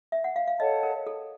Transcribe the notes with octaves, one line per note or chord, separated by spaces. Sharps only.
E5
F#5
F5
F5
A4 C#5 D#5 F#5 A5
A#4
A4